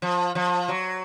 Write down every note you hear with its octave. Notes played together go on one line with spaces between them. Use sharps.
F3
F3
F#3